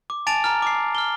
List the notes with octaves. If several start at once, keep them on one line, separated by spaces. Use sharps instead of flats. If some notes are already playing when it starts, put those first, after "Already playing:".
D6
G#5 A5 A6 D7 F7
A#5 F6
D6 C7
F6 G7